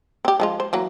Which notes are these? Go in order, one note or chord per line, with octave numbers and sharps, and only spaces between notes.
C4 G4
F3 G#3 F4
C5
E3 F#3 A#3